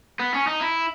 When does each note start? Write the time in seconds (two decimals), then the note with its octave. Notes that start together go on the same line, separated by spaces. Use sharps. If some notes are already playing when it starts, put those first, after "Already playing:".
0.19 B3
0.34 C#4
0.47 D#4
0.61 E4